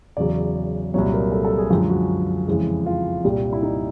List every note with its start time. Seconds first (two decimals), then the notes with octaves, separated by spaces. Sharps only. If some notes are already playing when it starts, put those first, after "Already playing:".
0.17 E2 C#3 F#3 D5
0.94 C2 A#2 F#3 C#5
1.14 A#4
1.32 A4
1.45 A4
1.58 G#4
1.70 F#2 D3 F3 G#3 G4
1.90 F#4
2.48 F2 C#3 E3 G#3
2.86 F4
3.24 C2 A#2 G3
3.53 E4
3.63 D#4